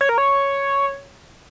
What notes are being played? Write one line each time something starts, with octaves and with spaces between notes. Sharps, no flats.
C#5
A#4
C#5